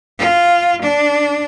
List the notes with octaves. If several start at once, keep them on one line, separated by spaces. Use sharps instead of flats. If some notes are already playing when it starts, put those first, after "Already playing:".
F4
D4